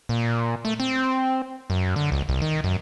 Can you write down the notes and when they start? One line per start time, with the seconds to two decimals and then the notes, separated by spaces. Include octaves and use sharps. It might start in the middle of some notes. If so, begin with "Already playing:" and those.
0.09 A#2
0.65 A3
0.80 C4
1.70 F#2
1.96 D3
2.12 C#2
2.29 C2
2.42 D#3
2.64 F#2